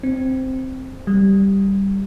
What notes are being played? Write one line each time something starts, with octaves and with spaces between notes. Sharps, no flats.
C4
G3